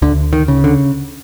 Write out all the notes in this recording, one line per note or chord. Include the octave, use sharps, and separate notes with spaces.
D2 D3
D#3
C#3
D3